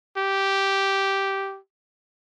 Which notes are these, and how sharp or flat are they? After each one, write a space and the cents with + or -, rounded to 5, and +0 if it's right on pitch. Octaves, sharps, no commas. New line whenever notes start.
G4 -5